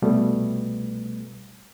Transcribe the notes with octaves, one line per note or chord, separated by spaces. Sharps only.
C2 B2 G3 A3 B3